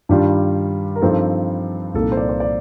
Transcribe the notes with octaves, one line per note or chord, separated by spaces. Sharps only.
G2 D#3 G3 D4 F4
A#4
G2 F3 C4 D#4 A4
C2 A#2 F3 A#3 D#4 A4
C5
D5
C5
D5